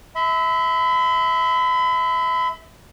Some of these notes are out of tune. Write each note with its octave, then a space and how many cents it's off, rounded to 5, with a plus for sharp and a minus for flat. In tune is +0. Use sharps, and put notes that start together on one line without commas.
E5 -20 B5 +40